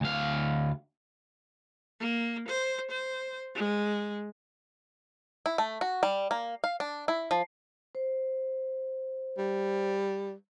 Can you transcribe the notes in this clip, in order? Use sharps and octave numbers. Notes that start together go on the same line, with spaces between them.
D2 F5
A#3
C5
C5
G#3
E4
A3
F#4
G3
A#3
F5
D4
E4
F3
C5
G3